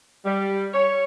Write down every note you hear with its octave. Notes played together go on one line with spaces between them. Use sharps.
G3
C#5